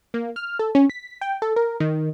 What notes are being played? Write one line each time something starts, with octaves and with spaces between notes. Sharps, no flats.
A#3
F6
A4
C#4
B6
G5
A4
A#4
D#3